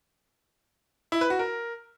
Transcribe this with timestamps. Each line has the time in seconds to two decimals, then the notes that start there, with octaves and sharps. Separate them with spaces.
1.12 E4
1.21 B4
1.30 F#4
1.39 A#4